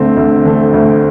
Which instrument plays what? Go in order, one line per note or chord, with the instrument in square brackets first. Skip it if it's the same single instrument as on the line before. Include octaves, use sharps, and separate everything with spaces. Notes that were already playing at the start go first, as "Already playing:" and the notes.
Already playing: [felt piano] D2 D3 A3 [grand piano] C4
[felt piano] D2
D3 A3
D2